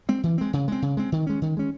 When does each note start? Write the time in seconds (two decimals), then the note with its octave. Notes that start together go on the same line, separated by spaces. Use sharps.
0.09 G#3 C4
0.23 E3
0.38 G#3 C4
0.53 C#3
0.68 G#3 C4
0.82 C#3
0.97 G#3 C4
1.12 D#3
1.27 G#3 C#4
1.42 D#3
1.57 G#3 C#4